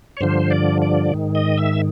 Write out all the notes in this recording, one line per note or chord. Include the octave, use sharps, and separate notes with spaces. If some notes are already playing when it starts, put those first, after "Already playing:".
C#5
G2 D3 F3 C5
D5
D5
G#2 D#3
D#5
E5